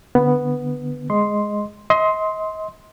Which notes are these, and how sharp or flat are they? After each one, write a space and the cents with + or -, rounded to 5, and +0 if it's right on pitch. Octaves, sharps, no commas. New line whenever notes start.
D3 +0 B3 +0
G#3 +0 D#5 +0 C6 +0
D#5 +35 C6 +0